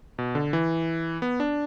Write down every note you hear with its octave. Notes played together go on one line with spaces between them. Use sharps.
B2
D3
E3
B3
D4